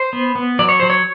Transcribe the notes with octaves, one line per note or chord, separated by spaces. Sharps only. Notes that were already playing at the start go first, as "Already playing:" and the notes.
Already playing: C5
B3
B3
F#3 D5
C#5
F#3 C5
C#5